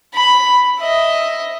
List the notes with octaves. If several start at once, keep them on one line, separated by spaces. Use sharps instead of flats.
B5
D#5 E5